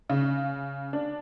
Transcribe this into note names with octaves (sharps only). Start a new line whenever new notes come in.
C#3
D4